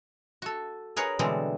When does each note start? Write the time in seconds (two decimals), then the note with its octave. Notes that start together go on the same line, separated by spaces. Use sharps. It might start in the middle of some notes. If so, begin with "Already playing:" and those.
0.42 F#4 A4
0.96 G#4 A#4 B4 C#5 F#5
1.19 B2 D3 E3 G3 G#3 C4